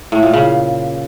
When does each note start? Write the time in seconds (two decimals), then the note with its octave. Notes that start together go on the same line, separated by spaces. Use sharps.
0.12 A2
0.23 A#2
0.33 C#3